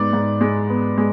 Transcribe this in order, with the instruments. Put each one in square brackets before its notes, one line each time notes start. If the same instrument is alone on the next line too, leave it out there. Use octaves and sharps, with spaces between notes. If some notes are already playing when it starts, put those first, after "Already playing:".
Already playing: [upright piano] G#2 B3 [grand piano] D5
[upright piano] G#2
G#3
B3
G#3